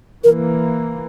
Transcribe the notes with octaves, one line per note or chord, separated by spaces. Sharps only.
E3 A#3 A#4